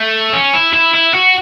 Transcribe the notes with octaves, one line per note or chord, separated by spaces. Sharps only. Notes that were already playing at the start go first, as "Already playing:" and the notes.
Already playing: A3
C#4
E4
E4
E4
F#4